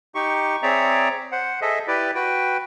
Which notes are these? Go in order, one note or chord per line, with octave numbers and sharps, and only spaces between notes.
D#4 G4 C#6
C4 G#4 C#5 D5 E5 A#5
C5 F#5
G#4 A4 D#5 E5
E4 G4 B4 D5
F#4 B4 G5